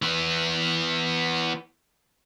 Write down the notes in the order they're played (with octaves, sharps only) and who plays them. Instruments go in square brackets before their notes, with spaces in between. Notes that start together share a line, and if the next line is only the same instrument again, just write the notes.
[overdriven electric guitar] E3 B3